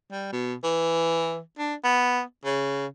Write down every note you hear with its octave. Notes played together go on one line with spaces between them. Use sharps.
G3
B2
E3
D4
B3
C#3